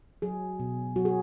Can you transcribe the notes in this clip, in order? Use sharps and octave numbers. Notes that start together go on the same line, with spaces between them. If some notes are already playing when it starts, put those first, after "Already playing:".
F#3 G#4
B2
F#3 F#4
G#4